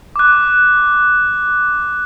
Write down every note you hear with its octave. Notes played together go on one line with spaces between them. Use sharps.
D6 F#6